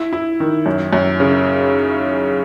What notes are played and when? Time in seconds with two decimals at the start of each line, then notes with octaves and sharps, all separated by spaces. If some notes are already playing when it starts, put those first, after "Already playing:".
Already playing: E4
0.13 E4
0.40 D#3
0.66 F#2
0.93 F#2
1.20 C#3